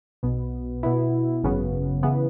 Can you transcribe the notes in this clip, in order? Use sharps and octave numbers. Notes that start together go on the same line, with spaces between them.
B1 B2 B3
B2 B3 E4
G#1 F#2 C#3 F#3 B3
C#3 E3 B3